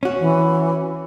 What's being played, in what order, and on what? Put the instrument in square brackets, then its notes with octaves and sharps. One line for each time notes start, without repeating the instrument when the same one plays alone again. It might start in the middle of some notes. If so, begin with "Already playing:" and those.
[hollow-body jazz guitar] C#4 F#4
[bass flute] E3